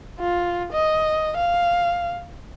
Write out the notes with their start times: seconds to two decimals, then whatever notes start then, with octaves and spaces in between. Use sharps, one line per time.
0.20 F4
0.73 D#5
1.37 F5